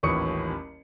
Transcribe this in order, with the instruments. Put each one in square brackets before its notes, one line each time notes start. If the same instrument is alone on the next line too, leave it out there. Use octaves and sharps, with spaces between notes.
[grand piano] D#1 A1 D#2 C#6 D#6 C#7